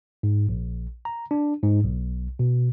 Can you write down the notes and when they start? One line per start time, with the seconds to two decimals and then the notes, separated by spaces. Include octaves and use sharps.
0.23 G#2
0.49 A#1
1.05 A#5
1.31 D4
1.62 G#2
1.84 B1
2.39 B2